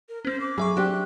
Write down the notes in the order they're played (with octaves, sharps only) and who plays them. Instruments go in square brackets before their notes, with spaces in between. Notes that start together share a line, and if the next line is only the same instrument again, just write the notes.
[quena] A#4
[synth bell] C4 C#4 [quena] C5
[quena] D6
[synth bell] F#3 E5 C#6 [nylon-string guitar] G#4
[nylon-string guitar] C4 D4 G4 [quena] F#6